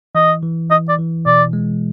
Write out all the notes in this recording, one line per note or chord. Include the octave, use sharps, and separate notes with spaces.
E3 D#5
E3
E3 D#5
D5
E3
B2 D5
G#3